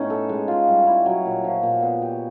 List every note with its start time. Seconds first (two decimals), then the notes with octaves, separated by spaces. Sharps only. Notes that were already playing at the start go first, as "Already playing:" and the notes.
Already playing: A2 B3 C#4 D#4
0.10 A4
0.29 G#3
0.48 F4
0.68 G3
0.87 E4
1.06 F#3
1.25 A#2
1.44 F3
1.63 A#2
1.83 B3
2.02 G4